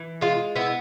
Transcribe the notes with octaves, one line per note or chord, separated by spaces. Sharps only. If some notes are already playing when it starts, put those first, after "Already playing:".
Already playing: E3
G#3 F4
B3 E4